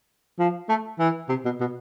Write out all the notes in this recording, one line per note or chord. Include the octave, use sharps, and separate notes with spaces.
F3
A3
E3
C3
B2
B2